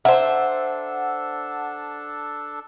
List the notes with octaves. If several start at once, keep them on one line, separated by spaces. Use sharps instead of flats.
D4 A4 C5 E5 F#5 E6